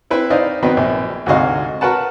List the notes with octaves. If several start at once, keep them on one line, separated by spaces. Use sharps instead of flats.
C4 E4 B4
D#4 C5 D5 D#5 F5
D#3 F#3 B3 C4 B4 D#5
A#1
D2 G#2 C3 F#4 D#5 F5
F#4 A#4 B4 F#5 A5